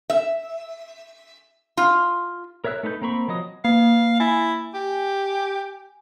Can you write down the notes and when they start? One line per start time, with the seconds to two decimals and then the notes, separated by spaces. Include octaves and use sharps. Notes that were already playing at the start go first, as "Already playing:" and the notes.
0.10 E5
1.77 F4
2.64 A#4 C#5 E5 E6 F#6
2.83 A3 D#4 B4 A#5 G6
3.01 A#3 C4 A#5 B5 C#6
3.28 F3 F#3 D#5 D#6
3.65 A#3 F5
4.20 E4 G#5
4.74 G4